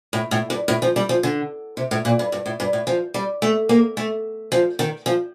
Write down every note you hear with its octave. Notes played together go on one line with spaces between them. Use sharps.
A2
A2
G2
A2
F3
G3
F3
D3
C3
A2
A#2
G2
G2
A2
G2
A2
F3
G3
A3
A#3
A3
F3
D#3
F3